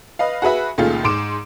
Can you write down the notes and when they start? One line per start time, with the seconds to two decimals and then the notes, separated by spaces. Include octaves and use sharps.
0.19 B4 D#5 F5
0.42 F#4 G#4 B4 E5
0.78 C#2 A#2 D#3 A3 F4 G#4
1.04 G#2 C6 D6 D7 E7